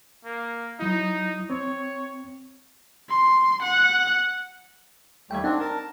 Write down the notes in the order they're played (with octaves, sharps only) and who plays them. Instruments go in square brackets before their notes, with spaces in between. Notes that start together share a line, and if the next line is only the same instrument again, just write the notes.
[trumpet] A#3
[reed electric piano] F#3 E4 [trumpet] D#4
[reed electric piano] C4 [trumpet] C#5
[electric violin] C6
F#5
[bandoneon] D#2 G3 A3 [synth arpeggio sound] G5 G#6
[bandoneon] C4 D4 [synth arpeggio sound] D#4 F#5
[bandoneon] A#4 A5